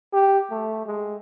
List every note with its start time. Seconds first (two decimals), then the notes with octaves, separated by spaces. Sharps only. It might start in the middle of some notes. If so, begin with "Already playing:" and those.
0.13 G4
0.51 A3
0.86 G#3